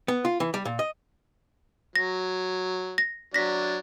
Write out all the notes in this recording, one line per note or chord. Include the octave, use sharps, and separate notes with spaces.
B3
F4
E3
G3
A#2
D#5
F#3 A#6
A#6
F#3 D4 A#6 B6